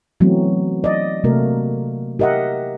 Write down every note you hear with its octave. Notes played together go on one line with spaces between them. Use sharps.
E3 F#3 A3 B3 C4
D5 D#5
C3 A3 A#3 F#4 A#4
G4 A#4 D#5 E5 F#5